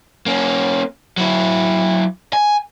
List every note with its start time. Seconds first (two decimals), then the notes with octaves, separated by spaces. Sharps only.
0.26 A#3 C#4
1.17 F#3 E4
2.33 G#5